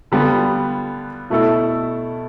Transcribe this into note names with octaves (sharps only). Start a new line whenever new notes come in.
D3 G3 B3 F4
B2 A3 E4 A4